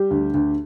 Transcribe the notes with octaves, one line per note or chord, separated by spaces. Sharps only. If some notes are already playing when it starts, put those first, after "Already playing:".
Already playing: G3 G4
D2
D2